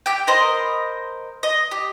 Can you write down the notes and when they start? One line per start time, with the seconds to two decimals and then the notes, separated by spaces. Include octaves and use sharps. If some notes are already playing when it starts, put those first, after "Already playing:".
0.06 G4 G5
0.27 A#4 C5 D#5 B5
1.43 D#5
1.71 G4